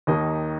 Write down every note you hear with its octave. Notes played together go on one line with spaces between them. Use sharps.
D#2 D#3 A#3 D#4 D#5